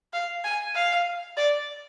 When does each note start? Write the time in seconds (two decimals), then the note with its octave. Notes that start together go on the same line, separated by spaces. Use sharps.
0.13 F5
0.44 G#5
0.75 F5
1.37 D5